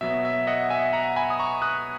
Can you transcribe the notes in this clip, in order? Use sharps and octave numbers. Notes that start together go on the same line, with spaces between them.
B2 F#3 B3 E5
E5
D#5 F#5
E5 G#5
F#5 A#5
G#5 B5
D#6
A#5 C#6
D#6 F#6